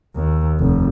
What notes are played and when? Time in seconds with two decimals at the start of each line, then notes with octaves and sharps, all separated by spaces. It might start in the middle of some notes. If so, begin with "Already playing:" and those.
0.15 D#2
0.59 F1